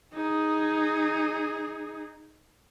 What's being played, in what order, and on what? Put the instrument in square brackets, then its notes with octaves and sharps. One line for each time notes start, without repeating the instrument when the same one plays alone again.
[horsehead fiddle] D#4 G#4